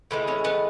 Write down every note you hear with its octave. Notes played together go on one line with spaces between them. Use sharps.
A2 E3 G#3 B4
C#4 C#5
B3 B4